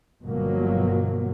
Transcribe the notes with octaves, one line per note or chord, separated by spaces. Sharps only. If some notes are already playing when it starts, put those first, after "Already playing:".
G1 B2 F3 F#3 A#3